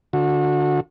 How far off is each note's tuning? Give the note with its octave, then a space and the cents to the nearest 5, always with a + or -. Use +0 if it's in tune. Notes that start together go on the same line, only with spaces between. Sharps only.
D3 +0 F#4 -30